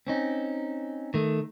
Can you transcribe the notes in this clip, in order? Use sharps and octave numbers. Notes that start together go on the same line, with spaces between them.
C4 C#4 D#4
D#3 A3